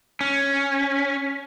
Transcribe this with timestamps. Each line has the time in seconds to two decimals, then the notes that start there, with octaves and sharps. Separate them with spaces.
0.21 C#4